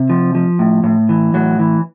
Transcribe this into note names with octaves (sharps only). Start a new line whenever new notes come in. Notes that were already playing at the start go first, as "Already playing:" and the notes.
Already playing: C3
F3
F3
A2
A2
E3
A2 F#3
E3